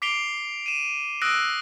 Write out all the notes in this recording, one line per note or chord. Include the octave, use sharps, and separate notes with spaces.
D6 B6 C7 D7 F7 G7
D#7 E7
D#6 E6 F#6 A#6 D7